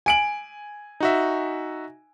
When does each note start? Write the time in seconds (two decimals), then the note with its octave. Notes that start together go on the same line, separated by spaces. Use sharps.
0.06 G#5 D7 F#7
1.00 D#4 F#4 E5